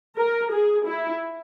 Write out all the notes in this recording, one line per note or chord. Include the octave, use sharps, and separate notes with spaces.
A#4
G#4
E4